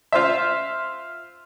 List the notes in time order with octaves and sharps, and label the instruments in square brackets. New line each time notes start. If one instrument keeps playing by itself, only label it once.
[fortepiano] F4 C5 E5